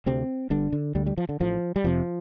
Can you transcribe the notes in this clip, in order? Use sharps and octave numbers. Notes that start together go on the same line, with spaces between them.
D2 C3 C4
G1 G2 D3 D4
D3
D2 D3 G3
G3
F3
D3
A1 A2 F3
G3
F1 F2 C3 F3